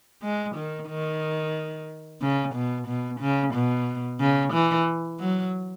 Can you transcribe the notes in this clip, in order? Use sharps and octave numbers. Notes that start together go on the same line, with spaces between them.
G#3
D#3
D#3
C#3
B2
B2
C#3
B2
C#3
E3
F#3